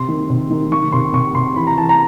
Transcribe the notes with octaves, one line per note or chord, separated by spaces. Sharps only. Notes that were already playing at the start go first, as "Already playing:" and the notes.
Already playing: C3 C6
D#3
C3
D#3
D#3 C#6
C3 C6
C3 C#6
C3 C6
E3 B5
A#5
E3 A5
A#5